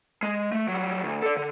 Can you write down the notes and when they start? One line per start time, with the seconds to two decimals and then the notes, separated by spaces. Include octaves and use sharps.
0.23 G#3
0.52 A3
0.68 F#3 G3
1.03 D2
1.22 A4 D5
1.37 D3